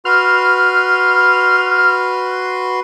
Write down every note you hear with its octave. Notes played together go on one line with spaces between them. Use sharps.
F#4 B4 C6 F6